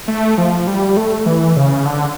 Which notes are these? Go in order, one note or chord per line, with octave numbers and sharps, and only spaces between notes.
A3
F3
G3
A3
E3
C#3
D3